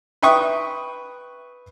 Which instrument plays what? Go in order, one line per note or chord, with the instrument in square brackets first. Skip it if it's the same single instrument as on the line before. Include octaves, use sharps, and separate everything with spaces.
[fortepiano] B4 E5 G5 C#6 D#6